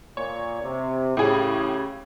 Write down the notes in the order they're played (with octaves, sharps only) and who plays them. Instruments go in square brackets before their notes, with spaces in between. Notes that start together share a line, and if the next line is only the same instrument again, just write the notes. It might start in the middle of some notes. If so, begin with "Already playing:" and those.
[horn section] A#2 [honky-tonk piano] C#5
[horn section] C3
[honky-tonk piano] A2 G#4 [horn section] C#3 G4